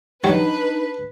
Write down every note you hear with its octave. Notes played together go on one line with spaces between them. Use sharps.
F#3 G3 D4 D#4 B4 C#5